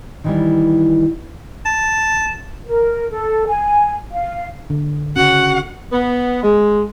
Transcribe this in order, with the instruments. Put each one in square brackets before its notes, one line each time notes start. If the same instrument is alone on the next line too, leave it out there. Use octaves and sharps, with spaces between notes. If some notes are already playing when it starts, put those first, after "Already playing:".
[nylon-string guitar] D#3 E3 G3
[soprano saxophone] A5
[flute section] A#4
A4
G#5
F5
[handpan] D3
[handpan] C#3 C#4 [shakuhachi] F#4 [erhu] F#5
[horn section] B3
G#3